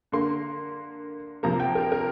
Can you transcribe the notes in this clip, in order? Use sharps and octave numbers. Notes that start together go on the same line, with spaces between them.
D3 A#3 C6
C3 F3 A#3 A#5
G5
A#4
A#4